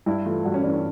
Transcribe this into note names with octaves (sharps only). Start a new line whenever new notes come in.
G2 E4
E3 A3 F4
G2 F#4
C#4
E3 A3 D4
C#4